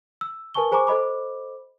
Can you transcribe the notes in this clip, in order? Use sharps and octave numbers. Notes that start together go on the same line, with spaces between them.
E6
A#4 B4 G#5 A5 C#6 G7
G#4 C5 G#5 A#5 C#6 D6
A4 C5 D#5 B5 D6